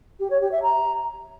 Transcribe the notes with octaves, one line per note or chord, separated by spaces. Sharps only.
G4
C#5
G4
E5
A#5